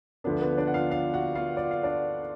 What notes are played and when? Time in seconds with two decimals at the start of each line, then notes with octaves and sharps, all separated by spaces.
0.24 D2 D3 F3 B3 D4 B4
0.41 B3 B4
0.57 D4 D5
0.67 F#5
0.74 F4 F5
0.91 F4 F5
1.13 F#4 F#5
1.35 F4 F5
1.57 D5
1.71 F5
1.83 D4 D5